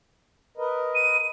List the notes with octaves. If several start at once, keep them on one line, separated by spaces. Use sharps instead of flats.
A#4 B4 D#5
D#7